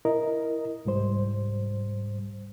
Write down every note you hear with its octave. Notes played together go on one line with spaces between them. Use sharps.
E4 A#4 D#5
C2 G#2 G3 C5